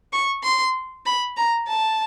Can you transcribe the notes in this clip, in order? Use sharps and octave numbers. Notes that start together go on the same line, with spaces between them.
C#6
C6
B5
A#5
A5